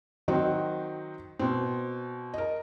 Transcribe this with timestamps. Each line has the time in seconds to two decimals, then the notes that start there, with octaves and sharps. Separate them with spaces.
0.28 D#3 F#3 C4 D#4 F#4
1.39 B2 C4
2.34 A#4 D#5